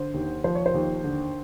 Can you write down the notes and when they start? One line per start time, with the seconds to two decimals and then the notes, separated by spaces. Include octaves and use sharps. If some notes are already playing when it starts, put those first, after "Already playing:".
Already playing: D3 C5
0.14 D#2
0.44 F3 C5
0.55 C#5
0.66 C5
0.74 D#2
1.04 D3